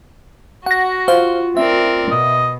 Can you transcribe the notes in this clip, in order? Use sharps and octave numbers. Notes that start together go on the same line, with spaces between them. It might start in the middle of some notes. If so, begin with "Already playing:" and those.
F#4 F#5 A#6
F4 C5 F5
C4 A#4 D5 E5
B2 D#5